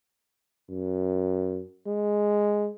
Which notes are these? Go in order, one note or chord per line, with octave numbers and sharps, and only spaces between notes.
F#2
G#3